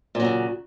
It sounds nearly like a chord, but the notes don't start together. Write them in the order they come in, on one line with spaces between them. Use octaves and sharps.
A#2 F#3 C#3